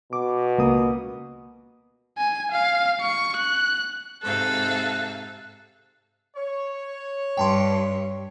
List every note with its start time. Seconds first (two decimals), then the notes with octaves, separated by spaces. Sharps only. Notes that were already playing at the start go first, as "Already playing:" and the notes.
0.13 B2 D6
0.58 C#2 A#3 D#6
2.18 G#5
2.51 F5
3.01 C#6
3.36 F#6
4.23 G#2 C3 A4 F5 F#6
6.35 C#5
7.37 G2 G5 A5 C6